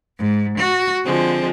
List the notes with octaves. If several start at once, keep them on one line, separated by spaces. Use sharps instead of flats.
G#2
F#4
D3 F3 G#3 C4